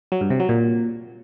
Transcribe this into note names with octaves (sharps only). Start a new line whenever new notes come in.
F#3
G2
C3
F#3
A#2